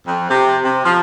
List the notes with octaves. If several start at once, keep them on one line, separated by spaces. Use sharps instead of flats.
F2
C3
C3
F3